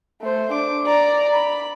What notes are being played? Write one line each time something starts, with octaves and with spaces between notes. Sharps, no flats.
A3 C5
D4 D6
D5 A#5
B5